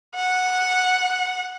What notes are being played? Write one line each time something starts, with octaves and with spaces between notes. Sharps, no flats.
F#5